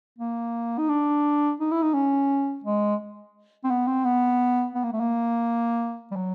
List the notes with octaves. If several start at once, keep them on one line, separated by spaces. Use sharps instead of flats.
A#3
D#4
D4
D#4
E4
D#4
C#4
G#3
C4
B3
C4
B3
B3
A#3
A3
A#3
G3
F#3